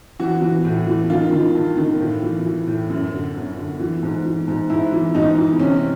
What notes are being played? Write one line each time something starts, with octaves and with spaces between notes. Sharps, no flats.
E3 F#4
E3
A2
E3
D#3 F4
D#3
G2
D#3
A2
E3
E3
A2
F#2
D3
F#2
D3
E3
G#2
E3
G#2
G#2 E4
E3
G#2 D#4
E3
C3 C#4